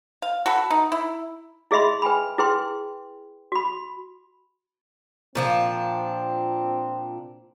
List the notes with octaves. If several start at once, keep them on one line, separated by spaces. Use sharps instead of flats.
F5
F#4 A4 B5
D#4
E4
E4 G#4 D#5 E5 B5 C6
B4 G5 G#5 B5
E4 G#4 B4 G5 C6
F#4 B5
A#2 F3 C4 D4